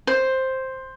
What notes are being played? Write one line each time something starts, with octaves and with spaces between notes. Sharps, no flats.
C5